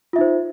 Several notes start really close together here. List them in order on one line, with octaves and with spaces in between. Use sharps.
F4 E5 D#4 C5